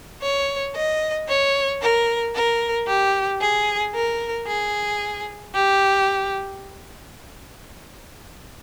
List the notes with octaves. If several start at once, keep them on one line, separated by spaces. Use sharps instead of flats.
C#5
D#5
C#5
A#4
A#4
G4
G#4
A#4
G#4
G4